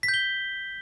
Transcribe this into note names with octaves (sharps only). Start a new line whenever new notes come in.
B6
G6
G7